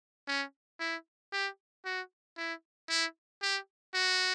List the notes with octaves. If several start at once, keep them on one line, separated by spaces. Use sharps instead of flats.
C#4
E4
G4
F#4
E4
E4
G4
F#4